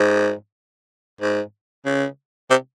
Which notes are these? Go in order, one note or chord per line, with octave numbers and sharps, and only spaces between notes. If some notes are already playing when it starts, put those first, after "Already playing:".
Already playing: G#2
G#2
C#3
C3